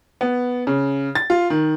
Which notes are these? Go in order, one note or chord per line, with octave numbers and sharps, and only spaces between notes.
B3
C#3
A6
F4
D#3